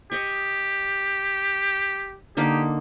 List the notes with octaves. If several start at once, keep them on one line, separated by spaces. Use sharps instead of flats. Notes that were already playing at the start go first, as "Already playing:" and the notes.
G4 D#5 C#6
D3 A#3 D#4 G4